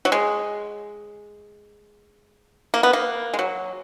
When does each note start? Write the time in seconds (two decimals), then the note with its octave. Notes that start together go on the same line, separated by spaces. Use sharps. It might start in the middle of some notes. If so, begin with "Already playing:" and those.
0.05 F#3
0.12 G#3
2.74 A#3
2.83 B3
2.93 A#3
3.34 G#3
3.39 F#3